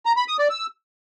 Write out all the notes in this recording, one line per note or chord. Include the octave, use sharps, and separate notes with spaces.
A#5
B5
D#6
D5
E6